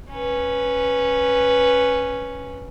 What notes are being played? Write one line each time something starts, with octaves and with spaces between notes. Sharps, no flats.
C#4 B4